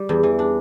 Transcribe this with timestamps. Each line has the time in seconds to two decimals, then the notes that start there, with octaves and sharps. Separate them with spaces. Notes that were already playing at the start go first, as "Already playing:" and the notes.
Already playing: G3
0.09 E2
0.23 E3
0.39 D4